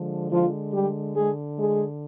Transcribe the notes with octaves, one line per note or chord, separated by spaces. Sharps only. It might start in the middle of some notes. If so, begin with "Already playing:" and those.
Already playing: D3 F3 G#3
F3 F4
G3 G4
G#3 G#4
G#3 G#4